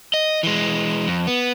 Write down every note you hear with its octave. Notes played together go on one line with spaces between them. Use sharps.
D#5
E3 G#3
F2
B3